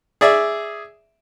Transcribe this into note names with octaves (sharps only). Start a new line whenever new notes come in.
G#4 D5 E5